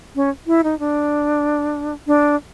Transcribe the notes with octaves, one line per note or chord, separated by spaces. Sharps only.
C#4
E4
D#4
D4
D4